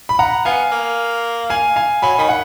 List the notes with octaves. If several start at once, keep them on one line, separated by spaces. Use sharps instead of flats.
B5
F#5 A#5
B3 F5 G#5
A#3
F5 G#5
F5 G#5
F#3 G#5 B5
D#3 B5
F#5